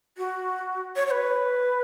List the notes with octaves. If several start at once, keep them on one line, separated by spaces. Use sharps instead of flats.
F#4
C#5
C#5
B4